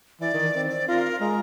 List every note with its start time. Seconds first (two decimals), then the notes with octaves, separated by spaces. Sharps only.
0.21 E3 D5
0.34 D#3
0.56 C4
0.69 D5
0.88 F4 A#4
1.21 G#3 A#5